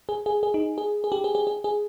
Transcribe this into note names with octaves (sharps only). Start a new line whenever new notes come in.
G#4
G#4
G#4
D#4
G#4
G#4
G4
G#4
G#4
G#4
G#4